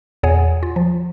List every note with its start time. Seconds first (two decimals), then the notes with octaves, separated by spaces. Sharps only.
0.23 E2 A#2 G#4 C#5 F#5 G#5
0.63 F4
0.76 F3